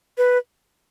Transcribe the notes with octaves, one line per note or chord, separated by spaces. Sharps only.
B4